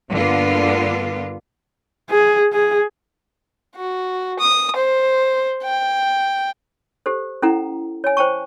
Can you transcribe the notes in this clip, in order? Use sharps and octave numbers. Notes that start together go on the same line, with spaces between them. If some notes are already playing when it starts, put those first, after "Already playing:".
G2 D3 A#3 B3 F4
G#4
G#4
F#4
D#6
C5
G5
G4 A4 C5
C#4 E4 A4 F#5 A#5
C#5 G#5
C5 G5 A5 C#6